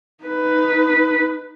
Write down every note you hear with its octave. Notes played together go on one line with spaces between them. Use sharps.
D#4 B4